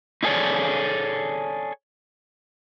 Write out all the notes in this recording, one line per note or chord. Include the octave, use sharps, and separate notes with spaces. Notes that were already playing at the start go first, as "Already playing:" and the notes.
D#4 E4 G#4 A4 C#5 D5